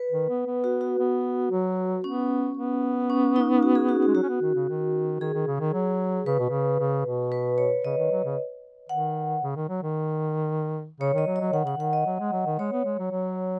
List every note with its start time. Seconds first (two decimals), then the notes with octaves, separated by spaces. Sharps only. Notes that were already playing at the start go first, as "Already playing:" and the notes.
Already playing: B4
0.11 D#3
0.29 B3
0.47 B3
0.64 F#4
0.81 F#4
0.99 B3
1.51 F#3
2.04 B3 C#4
2.57 B3
3.10 C#4
3.36 D#4
3.63 F#4
3.75 G#4
3.89 F#4
3.98 B3
4.02 F#4
4.07 G#3
4.15 F#3 F#4
4.23 C#4
4.29 B3
4.41 D#3
4.55 C#3
4.69 D#3
5.20 D#3 G#4
5.34 D#3
5.47 C#3
5.60 D#3
5.74 F#3
6.26 C#3 B4
6.39 B2
6.50 C#3
6.79 C#3
7.06 B2
7.32 B4
7.58 C#5
7.85 C#3 D#5
7.97 D#3
8.11 F#3
8.24 C#3
8.89 D#3 F#5
9.43 C#3
9.56 D#3
9.69 F#3
9.82 D#3
11.00 C#3 C#5
11.14 D#3 D#5
11.27 F#3
11.36 D#5
11.41 F#3
11.52 D#3 F#5
11.65 C#3 F#5
11.77 D#3 F#5
11.93 D#5
12.06 F#3
12.20 G#3
12.32 F#3
12.46 D#3
12.59 G#3 C#5
12.72 B3
12.85 G#3
12.99 F#3
13.11 F#3